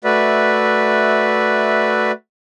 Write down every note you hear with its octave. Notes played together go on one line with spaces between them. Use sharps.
A3 F#4 B4 D5 E5